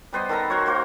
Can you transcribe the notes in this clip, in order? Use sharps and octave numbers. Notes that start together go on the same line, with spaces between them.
G3 B3 C5 D#5
D#3 A4 A#4 A#5
F#4 A#4 C5 C#5
A#3 F#4 C5